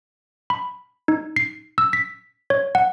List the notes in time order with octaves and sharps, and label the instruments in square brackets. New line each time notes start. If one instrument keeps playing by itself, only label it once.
[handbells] B5
D#4
C7
E6
B6
C#5
F#5